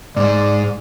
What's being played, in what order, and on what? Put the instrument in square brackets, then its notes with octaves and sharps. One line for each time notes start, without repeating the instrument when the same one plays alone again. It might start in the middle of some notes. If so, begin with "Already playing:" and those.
[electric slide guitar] G#2 G#3 [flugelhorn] D5